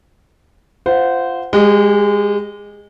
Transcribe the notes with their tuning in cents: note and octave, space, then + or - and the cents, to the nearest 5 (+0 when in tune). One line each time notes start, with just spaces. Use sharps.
F4 -15 C5 -15 F#5 +0
G#3 -20 G4 +5